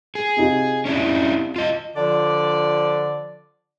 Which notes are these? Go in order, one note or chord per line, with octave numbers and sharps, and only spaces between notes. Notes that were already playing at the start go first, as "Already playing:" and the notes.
G#4
C3 D#4 F4
C#4 D4 E4
F4 D#5
D3 F3 D5